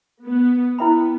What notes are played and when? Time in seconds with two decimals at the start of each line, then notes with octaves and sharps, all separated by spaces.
0.24 B3
0.78 B3 E4 B4 E5 G5 B5